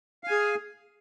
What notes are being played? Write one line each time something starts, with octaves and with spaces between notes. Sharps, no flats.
G#4 F5 G#5